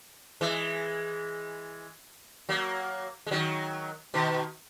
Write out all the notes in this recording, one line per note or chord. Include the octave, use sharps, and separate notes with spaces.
E3 G#3
F#3 A#3
G#3
D#3 F#3
B2 D#3